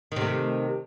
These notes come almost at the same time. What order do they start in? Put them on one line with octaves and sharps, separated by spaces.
D#3 C3 A3